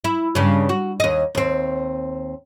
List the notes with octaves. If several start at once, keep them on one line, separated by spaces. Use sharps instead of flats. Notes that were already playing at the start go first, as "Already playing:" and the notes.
E4
G2 C#3
F#4
D#2 D#5
D#2 C4